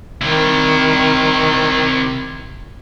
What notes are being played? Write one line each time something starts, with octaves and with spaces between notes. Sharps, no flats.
C3 D#3 E4